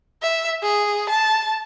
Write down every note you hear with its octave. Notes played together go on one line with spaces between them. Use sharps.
E5
G#4
A5